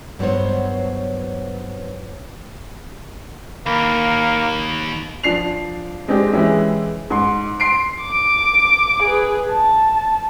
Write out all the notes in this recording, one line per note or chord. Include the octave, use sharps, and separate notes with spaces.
G2 F#3 B3 C5 C#5
D#2 A#3 B5
F3 D4 C7 F7
G#3 C4 D4 G4
E3 G#3 C#4 E4 G4
G#2 C6
C6 C7 D7
D6
G#4 B4
A5